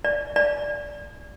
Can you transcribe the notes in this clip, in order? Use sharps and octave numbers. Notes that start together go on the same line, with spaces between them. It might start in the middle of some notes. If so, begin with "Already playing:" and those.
D5
D5